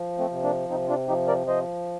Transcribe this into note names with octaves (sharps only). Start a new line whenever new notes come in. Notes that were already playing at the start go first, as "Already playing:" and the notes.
Already playing: F3
A3 C4
C3
A#3 D4
C3 C4 D#4
D4 F4
F3 D#4 G4
A#4 D5
F3 C5 D#5